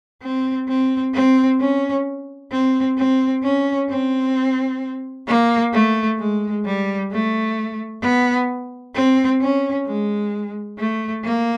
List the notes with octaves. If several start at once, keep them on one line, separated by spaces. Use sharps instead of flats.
C4
C4
C4
C#4
C4
C4
C#4
C4
A#3
A3
G#3
G3
A3
B3
C4
C#4
G#3
A3
A#3